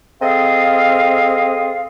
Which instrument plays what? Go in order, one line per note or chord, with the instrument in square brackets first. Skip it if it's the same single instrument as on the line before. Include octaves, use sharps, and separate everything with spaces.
[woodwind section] C4 G#4 A4 D#5 F5